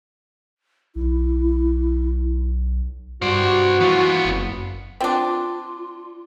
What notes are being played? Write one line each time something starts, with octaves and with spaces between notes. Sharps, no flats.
B1 E4
G2 F#4 C5 D5
E3 B3 F4
F#1
C4 D4 F4